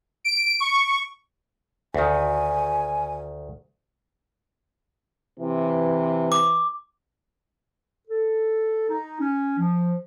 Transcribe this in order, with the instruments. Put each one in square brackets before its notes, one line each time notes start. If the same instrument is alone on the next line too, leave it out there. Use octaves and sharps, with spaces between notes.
[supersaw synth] D7
C#6
[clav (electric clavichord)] D2 D#3 [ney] G#5
[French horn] C3 [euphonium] E3
[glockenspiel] D6
[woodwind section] A4
D#4
C#4
F3